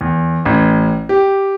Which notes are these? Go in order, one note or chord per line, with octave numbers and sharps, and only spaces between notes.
E2
A1
G4